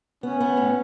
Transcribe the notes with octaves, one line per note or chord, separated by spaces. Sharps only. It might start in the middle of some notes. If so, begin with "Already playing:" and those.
B3 C#4
B3
A2